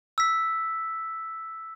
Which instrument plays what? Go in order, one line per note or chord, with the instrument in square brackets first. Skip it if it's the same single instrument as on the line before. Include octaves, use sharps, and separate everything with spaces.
[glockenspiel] E6 B6